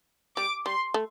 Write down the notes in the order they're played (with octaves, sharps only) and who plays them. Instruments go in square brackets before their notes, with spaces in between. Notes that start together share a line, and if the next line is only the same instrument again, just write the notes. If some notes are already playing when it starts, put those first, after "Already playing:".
[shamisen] G3 [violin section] D6
[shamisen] G3 [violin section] C6
[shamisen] A3